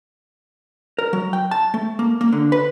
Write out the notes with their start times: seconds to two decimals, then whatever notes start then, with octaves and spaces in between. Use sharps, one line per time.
0.98 A#4
1.13 F#3
1.33 G5
1.51 A5
1.74 A3
1.99 A#3
2.21 A#3
2.32 D3
2.52 B4